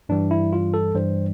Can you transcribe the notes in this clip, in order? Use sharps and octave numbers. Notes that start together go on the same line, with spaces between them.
G2 E3 G3 D4
E4
F4
A4
G2 E3 G3 C5